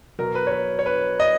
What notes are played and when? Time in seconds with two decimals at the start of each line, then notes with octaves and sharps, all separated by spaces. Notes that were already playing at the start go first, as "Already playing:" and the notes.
0.19 B2 F#3 A#4
0.35 B4
0.47 C#5
0.52 B4
0.79 C#5
0.86 B4
1.20 D#5